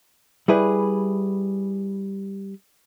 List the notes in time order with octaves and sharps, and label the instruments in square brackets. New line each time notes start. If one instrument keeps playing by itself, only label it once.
[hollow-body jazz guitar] G3 E4 G#4 B4